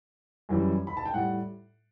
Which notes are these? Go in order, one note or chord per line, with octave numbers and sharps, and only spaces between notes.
F#2 E3 G3
B5
A5
G5
A2 G3 F#5